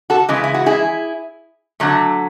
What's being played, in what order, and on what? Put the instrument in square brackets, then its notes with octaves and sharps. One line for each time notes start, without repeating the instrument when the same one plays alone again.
[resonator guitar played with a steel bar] F#4 A4
C#3 E3 G#3
E4
F#4
E4 G#4
D3 F#3 A3